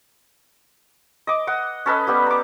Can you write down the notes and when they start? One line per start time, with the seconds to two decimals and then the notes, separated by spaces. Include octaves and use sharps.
1.27 D#5 D6
1.47 D#5 F#5
1.86 C#4 A4 B4 D#5
2.07 G3 B3 G4
2.27 A#5 D6